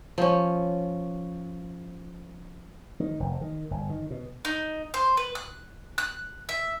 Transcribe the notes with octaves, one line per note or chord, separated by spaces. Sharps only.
F3 C#4
D#3
F1
D#3
G1
D#3
B2
D#4
C5
B4
F#6
F#6
E5